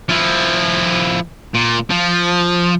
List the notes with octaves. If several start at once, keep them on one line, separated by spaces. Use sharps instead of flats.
F3 E4
A#2
F3